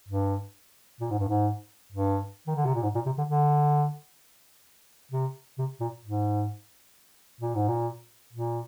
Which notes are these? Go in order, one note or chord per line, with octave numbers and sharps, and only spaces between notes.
G2
A#2
G#2
G2
G#2
G2
D#3
D3
C3
A#2
G#2
A#2
C3
D3
D3
C3
C3
A#2
G#2
A#2
G#2
A#2
A#2